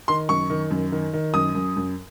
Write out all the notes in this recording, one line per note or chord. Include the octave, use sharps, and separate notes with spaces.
D#3 C6
F#2 C#6
D#3
F#2
D#3
D#3
F#2 D#6
F#2
F#2